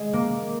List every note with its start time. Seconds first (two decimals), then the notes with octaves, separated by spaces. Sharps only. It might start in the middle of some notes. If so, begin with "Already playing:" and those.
Already playing: G#3
0.13 A#3